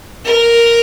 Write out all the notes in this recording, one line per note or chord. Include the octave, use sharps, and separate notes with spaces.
A#4